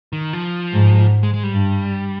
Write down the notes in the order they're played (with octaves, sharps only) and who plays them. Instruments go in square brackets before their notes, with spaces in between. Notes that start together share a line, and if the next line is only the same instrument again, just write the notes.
[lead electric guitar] D#3
F3
[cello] G#2
[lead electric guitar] G#3
G#3
G3
[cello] G2